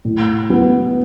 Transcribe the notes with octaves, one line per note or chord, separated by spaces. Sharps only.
A2
B3